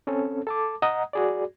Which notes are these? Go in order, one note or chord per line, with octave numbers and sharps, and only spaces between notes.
C4 C#4 A4
A4 A5 D6
D#5 F#5 A#5 D#6
F#4 G#4 D5